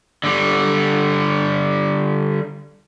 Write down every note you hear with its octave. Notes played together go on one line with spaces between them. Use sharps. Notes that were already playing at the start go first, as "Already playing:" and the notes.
D3 G3